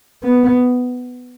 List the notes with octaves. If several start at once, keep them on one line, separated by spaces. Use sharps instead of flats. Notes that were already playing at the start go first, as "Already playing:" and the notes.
B3